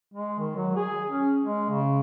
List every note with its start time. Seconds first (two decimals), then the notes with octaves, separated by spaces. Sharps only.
0.14 G#3
0.39 D#3
0.56 F#3
0.76 G#4
1.09 C#4
1.43 G#3
1.70 C#3